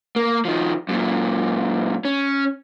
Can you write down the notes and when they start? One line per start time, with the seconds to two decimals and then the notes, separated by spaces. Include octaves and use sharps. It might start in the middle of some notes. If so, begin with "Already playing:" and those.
0.16 A#3
0.45 D#3 F3
0.89 F#2 A#2
2.05 C#4